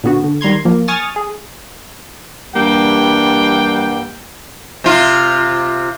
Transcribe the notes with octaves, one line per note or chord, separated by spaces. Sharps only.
A#2 D3 B3 F#4
D3
D#3 G3 A#5 C6 G#6
F3 A#3
G#5 C#6 D#6 F6 A6
G#4
G2 E3 G3 A#3 F#5 G5
C3 F4